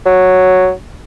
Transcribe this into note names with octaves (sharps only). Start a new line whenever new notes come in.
F#3